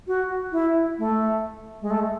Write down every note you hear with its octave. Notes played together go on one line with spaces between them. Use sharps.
F#4
E4
A3
G#3
A3